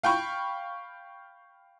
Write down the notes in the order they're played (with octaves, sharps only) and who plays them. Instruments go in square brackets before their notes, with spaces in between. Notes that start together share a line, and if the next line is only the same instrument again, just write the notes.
[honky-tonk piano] F5 G5 B5 C#6